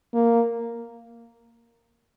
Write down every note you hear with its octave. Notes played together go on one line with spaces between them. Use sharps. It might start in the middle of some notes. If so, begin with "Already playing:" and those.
A#3